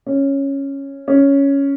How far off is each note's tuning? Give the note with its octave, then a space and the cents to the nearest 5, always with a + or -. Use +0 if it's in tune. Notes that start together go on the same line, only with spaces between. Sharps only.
C#4 -5
C#4 +5